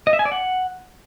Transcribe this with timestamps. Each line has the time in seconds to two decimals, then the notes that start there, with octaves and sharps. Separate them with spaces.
0.07 D#5
0.13 E5
0.19 G#5
0.25 D5
0.32 F#5